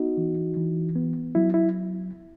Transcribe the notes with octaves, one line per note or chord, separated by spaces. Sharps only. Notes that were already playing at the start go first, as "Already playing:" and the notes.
Already playing: B3 D#4 F#4
E3
E3
B3
F#3 E4
E4